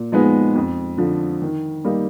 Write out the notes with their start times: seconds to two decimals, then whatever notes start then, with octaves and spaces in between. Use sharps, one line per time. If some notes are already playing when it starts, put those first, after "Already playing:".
Already playing: A#2
0.12 F3 G#3 B3 D#4
0.56 F2
0.98 D3 F3
1.42 D#3
1.84 G3 A#3 D#4